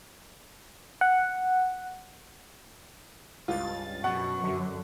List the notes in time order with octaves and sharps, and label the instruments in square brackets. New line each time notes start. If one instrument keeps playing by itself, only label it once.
[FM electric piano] F#5
[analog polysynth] C#2 G2 A6 [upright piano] F4
[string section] F#2 [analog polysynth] B2 [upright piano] F#5 [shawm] C#6
[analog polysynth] D3